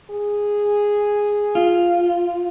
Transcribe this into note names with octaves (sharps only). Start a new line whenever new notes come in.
G#4
F4